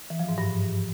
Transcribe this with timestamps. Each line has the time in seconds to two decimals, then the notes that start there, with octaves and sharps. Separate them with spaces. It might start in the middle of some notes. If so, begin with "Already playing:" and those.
0.10 E3
0.19 F3
0.29 G#2
0.38 G2